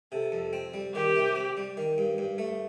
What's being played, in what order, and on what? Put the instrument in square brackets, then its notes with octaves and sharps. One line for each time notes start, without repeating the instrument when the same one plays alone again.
[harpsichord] C3 [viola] A4
[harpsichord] F2
C4
G3
[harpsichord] D#3 [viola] G4
[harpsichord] C3
C4
G3
D#3
G2
G2
A3